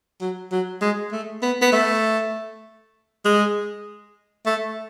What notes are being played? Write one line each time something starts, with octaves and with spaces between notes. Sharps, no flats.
F#3
F#3
G#3
A3
B3
B3
A3
G#3
A3